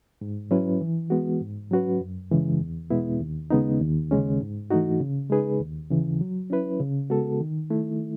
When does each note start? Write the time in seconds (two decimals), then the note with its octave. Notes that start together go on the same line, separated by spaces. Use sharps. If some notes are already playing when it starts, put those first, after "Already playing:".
0.21 G#2
0.51 F#3 C#4 E4 B4
0.81 E3
1.10 G#3 B3 F#4
1.41 G#2
1.71 F#3 C#4 F#4 B4
2.01 F#2
2.31 C#3 E3 G#3
2.61 E2
2.90 B2 G#3 B3 E4
3.20 D#2
3.50 C#3 G#3 B3 D#4
3.81 D#2
4.11 C#3 G#3 C#4
4.41 G#2
4.70 E3 A3 D#4 F#4
5.00 C#3
5.30 G#3 D#4 G#4 B4
5.60 D#2
5.90 C#3 E3
6.21 F#3
6.50 C#4 E4 B4
6.80 C#3
7.10 G#3 B3 F#4 A4
7.41 D#3
7.70 A3 E4